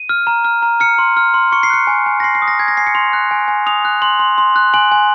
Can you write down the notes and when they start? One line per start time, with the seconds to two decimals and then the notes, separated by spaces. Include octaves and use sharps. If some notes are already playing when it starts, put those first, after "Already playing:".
Already playing: D#7
0.09 F6
0.27 A#5
0.44 F6
0.62 A#5
0.80 F6 C#7
0.98 C6
1.17 F6
1.34 C6
1.52 C#6 C#7
1.63 C7
1.70 F#6 C#7
1.87 G#5
2.06 G#5
2.20 A#6
2.23 C6 C7
2.35 C7
2.42 D#6
2.48 A#6
2.59 G#5 G#6
2.68 A#6
2.77 G#5 C7
2.87 C#7
2.95 C6 F7
3.13 F#6
3.31 G#5
3.48 G#5
3.66 D#6 F7
3.85 F#6
4.02 C6 F#7
4.19 C6
4.38 C6
4.56 F#6
4.74 G#5 F#7
4.92 G#5